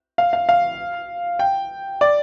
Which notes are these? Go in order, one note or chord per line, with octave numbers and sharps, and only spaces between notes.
F5
F5
F5
G5
D5